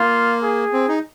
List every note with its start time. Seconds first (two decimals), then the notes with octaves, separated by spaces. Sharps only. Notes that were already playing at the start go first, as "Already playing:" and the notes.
Already playing: A#3 F4
0.43 G#4
0.73 C4
0.88 D#4